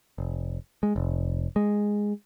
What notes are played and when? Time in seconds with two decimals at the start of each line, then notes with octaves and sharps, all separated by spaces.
0.18 F1
0.83 G#3
0.96 F1
1.56 G#3